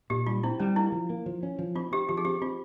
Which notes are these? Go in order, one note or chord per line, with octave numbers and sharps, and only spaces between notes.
A#2 G4
G3 F4
C4 E4
G3 C#4
A#3 E4
F3
A#3
F3
C#4
F3
C4 F4
C4 G4
F3 G4
G#4
C4 G4
C4 F4